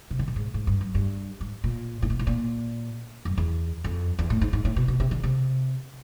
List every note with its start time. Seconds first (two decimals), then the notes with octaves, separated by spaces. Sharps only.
0.11 C3
0.19 D3
0.28 A#2
0.36 G#2
0.54 G#2
0.67 G2
0.81 F#2
0.95 G2
1.41 G#2
1.64 A#2
2.02 A2
2.10 A#2
2.19 A2
2.27 A#2
3.25 F#2
3.37 E2
3.84 F2
4.19 E2
4.30 A2
4.41 G#2
4.53 G#2
4.65 A2
4.76 B2
4.88 B2
5.00 C3
5.11 D3
5.23 C3